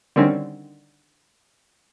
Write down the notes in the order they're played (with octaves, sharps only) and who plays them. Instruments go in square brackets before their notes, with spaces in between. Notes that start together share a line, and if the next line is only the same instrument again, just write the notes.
[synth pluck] D3 D#3 G3 C4 C#4